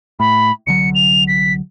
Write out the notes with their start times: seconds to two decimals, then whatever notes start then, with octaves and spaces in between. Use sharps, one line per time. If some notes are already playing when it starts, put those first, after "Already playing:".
0.20 A2 B5
0.67 C2 D3 F#3 C#7
0.95 F7
1.28 B6